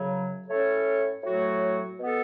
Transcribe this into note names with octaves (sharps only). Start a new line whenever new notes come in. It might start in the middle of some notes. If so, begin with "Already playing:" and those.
Already playing: F#2 C#3 F#3
A2 A3 C#4 A4 C#5
A2 F#3 A3 F#4 C#5
B2 B3 A4